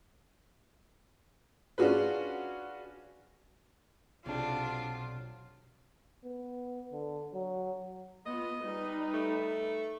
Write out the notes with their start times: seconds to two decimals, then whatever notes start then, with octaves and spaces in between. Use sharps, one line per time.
1.78 C#4 D4 F4 F#4 G#4 B4
4.26 B1 C3 D4 F4
6.25 B3
6.93 D3
7.34 F#3
8.26 B3 F4 D#5
8.63 G3 D#4 B4
9.13 A3